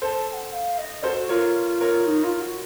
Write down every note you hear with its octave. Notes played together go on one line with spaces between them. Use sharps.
A4 C5 A5
A5
F#5
F5
D#5
F#4 A4 C5
F4 A#4 C#5
A#4 C#5
D#4
F4
F#4